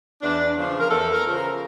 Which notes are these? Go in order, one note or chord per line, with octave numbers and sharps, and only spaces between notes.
E2 D4
C#3 F3
A#4
E2 A4
A#4
C#3 F3
A#4